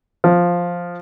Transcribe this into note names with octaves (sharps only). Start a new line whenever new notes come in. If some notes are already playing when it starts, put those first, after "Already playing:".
F3